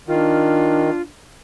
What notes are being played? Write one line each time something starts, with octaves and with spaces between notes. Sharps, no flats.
D#3 D4 F4